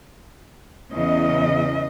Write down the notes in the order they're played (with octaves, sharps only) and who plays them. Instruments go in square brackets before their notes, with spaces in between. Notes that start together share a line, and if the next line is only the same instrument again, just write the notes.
[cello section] E2 C#3 D#5